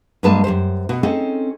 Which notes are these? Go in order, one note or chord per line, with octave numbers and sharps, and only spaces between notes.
G2 F#3 G#3 A#3 B4 A5
F#2 C3 G4 C5
B2 F#4
C4 C#4 D#4 G#4 A4